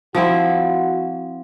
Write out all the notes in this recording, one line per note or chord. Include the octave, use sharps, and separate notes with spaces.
F3 C4 E4 F#4